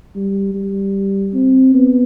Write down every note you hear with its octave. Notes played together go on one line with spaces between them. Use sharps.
G3
G3
C4
B3